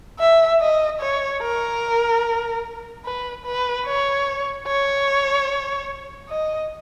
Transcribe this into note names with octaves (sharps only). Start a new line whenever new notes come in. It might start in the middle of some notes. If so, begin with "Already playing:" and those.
E5
D#5
C#5
A#4
B4
B4
C#5
C#5
D#5